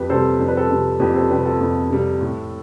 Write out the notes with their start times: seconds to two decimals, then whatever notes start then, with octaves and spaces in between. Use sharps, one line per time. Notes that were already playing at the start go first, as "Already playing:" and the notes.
Already playing: F2 G4 B4
0.09 C3 G3 A4 C5
0.39 F2 C5
0.48 B4
0.57 A4 C5
0.70 C3 G3
1.00 F2 G4 B4
1.15 A4 C5
1.30 C3 G3 G4 B4
1.45 F4 A4
1.60 F2
1.90 C3 G3
2.21 A2